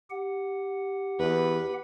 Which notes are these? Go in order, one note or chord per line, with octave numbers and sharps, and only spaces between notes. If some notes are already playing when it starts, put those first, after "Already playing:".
G4 F#5
E2 B4